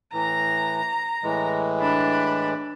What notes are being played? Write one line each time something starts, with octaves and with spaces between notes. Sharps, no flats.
A2 E3 A#5
A2 E3 G#3
D4 B5